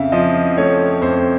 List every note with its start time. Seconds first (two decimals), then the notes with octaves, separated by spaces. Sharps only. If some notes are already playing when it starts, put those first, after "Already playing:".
Already playing: F2 C#3 E5 F5
0.12 F3 D#5
0.57 A3 C#5
1.02 F2 C5